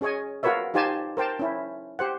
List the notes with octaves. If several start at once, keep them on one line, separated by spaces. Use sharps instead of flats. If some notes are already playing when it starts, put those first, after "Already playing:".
C#4 G#4 C#5 D#5 G#5
F4 F#4 A#4 B4 C#5 E5
D#4 F4 G4 C5 G#5 A5
A#4 C5 G5 A5
C#4 E4
G4 C5 F#5